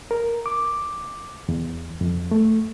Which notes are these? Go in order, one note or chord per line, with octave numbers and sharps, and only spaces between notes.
A#4
D6
E2
F2
A3